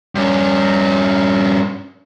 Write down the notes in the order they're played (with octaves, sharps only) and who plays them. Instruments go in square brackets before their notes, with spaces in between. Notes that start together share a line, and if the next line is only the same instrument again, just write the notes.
[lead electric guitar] G2 C#4